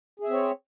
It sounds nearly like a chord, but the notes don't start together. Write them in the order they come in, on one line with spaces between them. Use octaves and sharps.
G#4 E5 C4 C#5